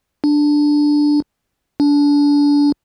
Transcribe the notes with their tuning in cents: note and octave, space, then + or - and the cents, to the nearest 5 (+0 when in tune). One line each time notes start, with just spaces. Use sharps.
D4 +5
D4 -25